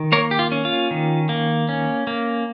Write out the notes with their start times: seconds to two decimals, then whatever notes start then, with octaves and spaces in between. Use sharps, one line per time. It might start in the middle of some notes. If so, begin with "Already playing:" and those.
Already playing: D#3
0.12 A#3 A#4 C#5
0.31 G4
0.39 F4
0.52 C#4
0.65 F4
0.91 D#3
1.29 A#3
1.69 C#4
2.07 A#3